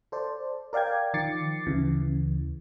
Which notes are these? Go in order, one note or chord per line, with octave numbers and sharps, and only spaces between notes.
A4 C5 D5
A#4 D5 F5 G5 G#6
D#3 F3 D6 A6 C7 C#7
D2 C#3 E3